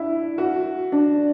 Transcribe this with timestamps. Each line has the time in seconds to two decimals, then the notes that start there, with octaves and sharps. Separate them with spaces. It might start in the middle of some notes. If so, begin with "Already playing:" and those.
Already playing: D4 E4
0.38 F#4
0.92 D4